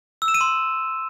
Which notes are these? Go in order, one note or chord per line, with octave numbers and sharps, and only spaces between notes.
E6
E7
D#7
C6